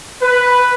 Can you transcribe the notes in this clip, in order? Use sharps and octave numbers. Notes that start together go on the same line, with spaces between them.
B4